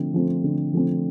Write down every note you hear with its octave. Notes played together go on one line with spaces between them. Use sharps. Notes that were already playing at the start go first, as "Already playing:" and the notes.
Already playing: D3 F3 A3 C4
F3 A3 C4
D3
F3 A3 C4